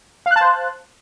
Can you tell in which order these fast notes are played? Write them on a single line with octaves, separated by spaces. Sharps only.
F5 F#6 A5 C5